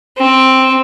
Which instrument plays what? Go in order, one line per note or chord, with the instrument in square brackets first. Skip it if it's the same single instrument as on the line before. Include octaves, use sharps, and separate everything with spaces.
[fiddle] C4